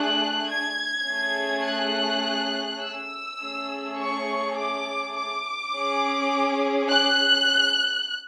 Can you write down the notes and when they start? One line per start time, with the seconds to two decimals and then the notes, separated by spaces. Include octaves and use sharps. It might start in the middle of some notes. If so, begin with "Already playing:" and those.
Already playing: A3 D4 G#4 F#6
0.49 G#6
1.09 A3 C#4 G#4
1.66 F#6
2.83 E6
3.41 A3 C#4 G#4
3.99 C#6
4.57 D6
5.17 D6
5.74 C#4 G#4
6.90 F#6